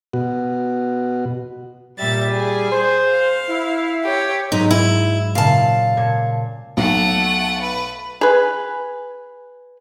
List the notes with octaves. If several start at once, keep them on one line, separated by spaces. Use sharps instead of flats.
B2 F#4
A#2 G3 E5 A6
G#4
C5
F5
E4
G4 C#5
G#2 F#3 G#3 D#4
E4
A#2 C#3 F5 A5
A#2 G#6 C#7
B1 A3 F#5
B4
G#4 B4